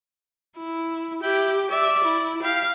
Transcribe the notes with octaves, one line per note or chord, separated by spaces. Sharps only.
E4
E4 G4 G5
D5 E5
E4
G4 F5